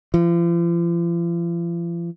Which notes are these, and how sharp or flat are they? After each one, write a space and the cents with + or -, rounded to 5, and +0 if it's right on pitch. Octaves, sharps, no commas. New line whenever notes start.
F3 -45